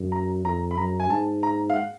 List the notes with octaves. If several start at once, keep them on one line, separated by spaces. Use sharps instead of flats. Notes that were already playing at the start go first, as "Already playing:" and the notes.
Already playing: F#2
A#5
F2 A#5
B5
F#2 A#5
G#5
G#2 A5
A#5
F5
F#5